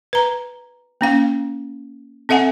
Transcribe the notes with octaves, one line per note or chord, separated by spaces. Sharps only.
B4 A#5
A#3 C#4 F5
C4 A4 E5 F#5 G#5